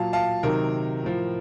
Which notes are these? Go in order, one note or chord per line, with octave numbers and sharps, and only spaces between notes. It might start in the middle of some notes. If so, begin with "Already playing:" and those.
Already playing: A#2 F#3 F5 A5
F5 A5
C3 D#3 F#3 A#4
A2 F3